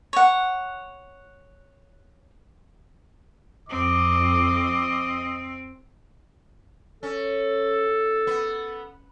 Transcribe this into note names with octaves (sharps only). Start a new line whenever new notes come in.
C#5 F#5
F2 C4 D#5 D6
C#4 A4
B3